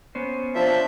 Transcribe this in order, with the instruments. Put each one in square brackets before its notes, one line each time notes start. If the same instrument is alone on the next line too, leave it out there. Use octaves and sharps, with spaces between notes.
[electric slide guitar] B3 C#4 C5
[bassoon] F3 [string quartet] D4 G6 [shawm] E5